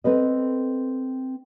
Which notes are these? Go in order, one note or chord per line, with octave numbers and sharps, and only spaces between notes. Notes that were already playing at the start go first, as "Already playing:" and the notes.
C4 A4 B4 D#5